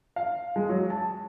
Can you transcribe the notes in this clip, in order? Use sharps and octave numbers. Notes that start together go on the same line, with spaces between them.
F5
G#3
F#3
A5